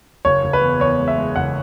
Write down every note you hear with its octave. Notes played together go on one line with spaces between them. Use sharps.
F#1 C#5
F#1
B4
E2
E2 C#5
G#3
E5
G#3
F#1 F#5